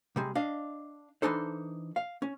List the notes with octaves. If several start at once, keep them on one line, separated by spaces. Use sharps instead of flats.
C3 G3 G#3
D4 D#5 F5
E3 B3 D4 D#4 A4 C5
F5
C#4